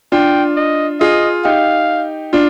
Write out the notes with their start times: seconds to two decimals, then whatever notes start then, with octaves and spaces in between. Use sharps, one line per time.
0.12 D4 F4 G5
0.57 D#5
1.00 F4 G#4 D#5
1.45 D#4 G4 F5
2.33 D4 F4